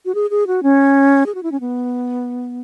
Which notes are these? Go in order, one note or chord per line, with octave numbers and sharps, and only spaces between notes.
F#4
G#4
G#4
F#4
C#4
G#4
F#4
E4
C#4
B3